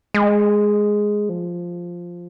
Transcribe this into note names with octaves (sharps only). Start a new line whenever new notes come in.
G#3
F3